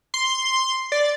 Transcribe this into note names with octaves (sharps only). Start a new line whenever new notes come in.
C6
D5